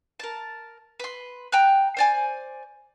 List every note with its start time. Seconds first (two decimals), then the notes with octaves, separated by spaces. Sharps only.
0.20 A#4 A5
1.00 B4 C6
1.52 G5 A#5 F#6
1.97 C5 D5 G#5